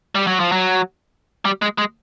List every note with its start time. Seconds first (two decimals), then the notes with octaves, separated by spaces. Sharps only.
0.15 G3
0.27 F#3
0.40 F3
0.52 F#3
1.45 G3
1.62 G#3
1.78 G#3